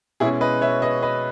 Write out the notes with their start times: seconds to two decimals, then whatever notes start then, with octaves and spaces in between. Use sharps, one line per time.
0.20 B2 G#3 C#4 E4 G#4
0.41 B4 D#5
0.61 C#5 E5
0.82 B4 D#5
1.02 B4 D#5